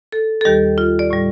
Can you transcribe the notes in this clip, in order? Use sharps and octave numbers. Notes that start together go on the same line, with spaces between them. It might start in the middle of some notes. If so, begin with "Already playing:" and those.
A4
A4
D#2 D#3 G3 G4
F4
D5
A2 G3